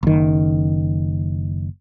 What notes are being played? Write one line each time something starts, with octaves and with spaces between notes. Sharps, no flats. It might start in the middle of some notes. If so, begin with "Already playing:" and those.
F#1 D#3